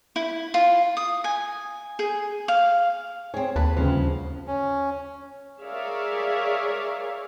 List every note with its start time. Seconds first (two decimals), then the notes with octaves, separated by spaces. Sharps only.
0.16 E4
0.54 F4
0.97 D#6
1.24 G#5
1.99 G#4
2.48 F5
3.34 C4 G#4 C#5
3.56 D#2 B4 A5
3.77 D2 G2 C#3 F3
4.47 C#4
5.63 G#4 A#4 C#5 D5 E5 F5